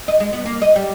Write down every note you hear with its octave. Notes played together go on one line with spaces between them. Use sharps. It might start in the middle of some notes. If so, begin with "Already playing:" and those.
D#5
G#3
B3
A#3
D#5
G3